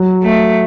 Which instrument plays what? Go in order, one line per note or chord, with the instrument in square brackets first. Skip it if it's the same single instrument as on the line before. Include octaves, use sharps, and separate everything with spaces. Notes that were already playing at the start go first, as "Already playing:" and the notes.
Already playing: [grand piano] F#3
[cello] A3